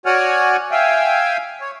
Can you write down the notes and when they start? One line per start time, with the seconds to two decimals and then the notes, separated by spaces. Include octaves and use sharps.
0.06 F#4 C#5 D5 F#5 G#5 F6
0.71 E5 F5 G5 G#5
1.61 C#5